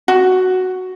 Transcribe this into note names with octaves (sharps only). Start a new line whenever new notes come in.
F#4